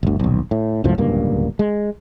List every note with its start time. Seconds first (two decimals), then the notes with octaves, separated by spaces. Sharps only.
0.03 G1 D2
0.20 D#1 B1
0.51 A2
0.84 C#2 F#2 A2 F3
0.98 D1 C#2 G2 A#3
1.59 G#3